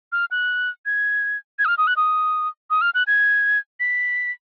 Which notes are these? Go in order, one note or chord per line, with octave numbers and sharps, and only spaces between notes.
F6
F#6
G#6
G#6
D#6
F6
D#6
F#6
D#6
D#6
F6
F#6
G#6
B6